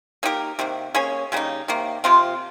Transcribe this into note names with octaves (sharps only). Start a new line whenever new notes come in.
A#3 D#4 G4 A#4
C3 D#3 A#3
A#3 C#4 G#4 C#5
C#3 G3 A#3 D#4
C3 D#3 A#3
C3 F3 C4 F4